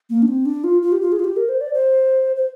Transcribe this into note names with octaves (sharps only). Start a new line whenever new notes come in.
A#3
D4
C4
D4
F4
F4
G4
F4
G#4
F4
G4
A#4
C5
D5
C5
C5